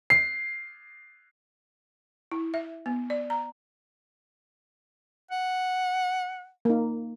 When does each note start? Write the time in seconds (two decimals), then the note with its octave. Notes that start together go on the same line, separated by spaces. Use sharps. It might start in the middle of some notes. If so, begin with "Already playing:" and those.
0.10 C7
2.32 E4
2.54 E5
2.86 B3
3.10 D5
3.30 A#5
5.31 F#5
6.65 A#3 D#4